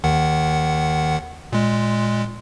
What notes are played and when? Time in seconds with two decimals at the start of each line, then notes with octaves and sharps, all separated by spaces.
0.04 D#2 D#3 F#5
1.52 A#2 G#3